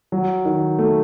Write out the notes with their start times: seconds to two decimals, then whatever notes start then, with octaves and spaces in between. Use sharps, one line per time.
0.12 F#3
0.45 D#3
0.79 A3